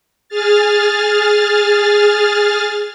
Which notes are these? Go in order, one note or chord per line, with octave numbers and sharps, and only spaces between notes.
G#4 F6 A6